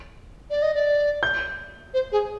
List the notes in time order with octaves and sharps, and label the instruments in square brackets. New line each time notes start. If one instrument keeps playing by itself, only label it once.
[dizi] D5
D#5
D5
[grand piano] G6
[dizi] C5
G#4